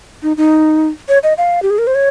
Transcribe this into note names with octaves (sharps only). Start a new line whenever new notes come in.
D#4
D#4
C#5
D#5
F5
G4
G#4
A#4
C5
C#5